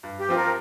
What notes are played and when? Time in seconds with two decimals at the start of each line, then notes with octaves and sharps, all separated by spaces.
0.03 G2
0.20 G4
0.29 F3 C4 F4
0.37 A#4